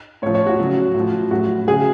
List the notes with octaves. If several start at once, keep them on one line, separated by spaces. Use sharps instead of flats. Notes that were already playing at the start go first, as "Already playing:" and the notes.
A2 F3 C#5
C#5
F#4
C#3 F#3
A2
F3
A2 F#3 F#4
C#3 F#3 G#4